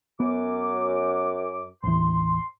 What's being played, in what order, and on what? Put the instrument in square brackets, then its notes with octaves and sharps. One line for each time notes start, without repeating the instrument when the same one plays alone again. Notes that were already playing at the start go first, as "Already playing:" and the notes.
[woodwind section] F#2 D6 [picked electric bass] B3
[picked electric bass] A1 D#2 E3 [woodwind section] C6